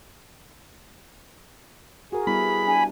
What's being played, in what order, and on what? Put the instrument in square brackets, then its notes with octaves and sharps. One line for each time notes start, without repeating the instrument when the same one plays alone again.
[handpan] F#4 A#4 [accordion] G#4
[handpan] G3 B3 E4 [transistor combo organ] B5
[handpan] D4 [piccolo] G#5